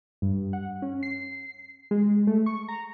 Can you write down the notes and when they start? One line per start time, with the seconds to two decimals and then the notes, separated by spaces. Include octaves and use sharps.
0.22 G2
0.53 F#5
0.82 C#4
1.03 C7
1.91 G#3
2.27 A3
2.46 C#6
2.68 A#5